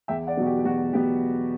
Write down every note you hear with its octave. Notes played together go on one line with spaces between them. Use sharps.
E2 E5 G5
D5 F#5
B2 F#3 B3 F#4
G4
G4
E2 F#4
B2 F#3 B3 G4